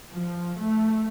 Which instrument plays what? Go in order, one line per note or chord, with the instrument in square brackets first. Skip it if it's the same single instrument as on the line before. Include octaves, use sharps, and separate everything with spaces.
[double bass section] F3
A3